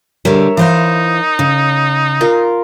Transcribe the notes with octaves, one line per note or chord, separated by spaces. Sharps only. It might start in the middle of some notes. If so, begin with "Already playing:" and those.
D3 G3 A#4 C#5 E5
E3 D#4 C5 F5
C#3
F4 A#4